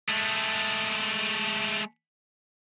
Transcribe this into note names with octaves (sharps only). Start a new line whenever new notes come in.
G#3 A3